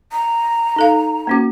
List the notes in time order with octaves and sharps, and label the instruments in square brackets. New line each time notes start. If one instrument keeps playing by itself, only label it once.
[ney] A#5
[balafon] D#4 A4 F5
A#3 C#4 F#4